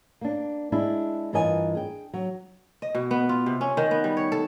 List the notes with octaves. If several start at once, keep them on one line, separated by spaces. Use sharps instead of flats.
A#3 D4
G#3 D4 E4
G2 E3 F4 A#4 D#5 G#5
G#4 G5
F#3
D#5
B2
B3
F4
C3
C#4
D#3
B3
G3
C#5
A4